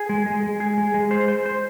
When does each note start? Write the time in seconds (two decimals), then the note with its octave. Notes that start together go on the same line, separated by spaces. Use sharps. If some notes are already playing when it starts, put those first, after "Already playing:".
Already playing: G#4
0.09 G#3
0.26 G#3
0.43 G#3
0.60 G#4
0.78 G#3
0.94 G#3
1.11 C5
1.28 C5
1.46 C5